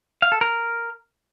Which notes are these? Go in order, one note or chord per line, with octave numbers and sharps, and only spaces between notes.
F5
A4
A#4